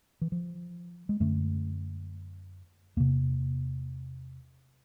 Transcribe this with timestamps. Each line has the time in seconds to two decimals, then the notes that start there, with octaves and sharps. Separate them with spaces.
0.21 E3
0.32 F3
1.09 G#3
1.20 F#2 D3 A3
2.97 E2 C3 A#3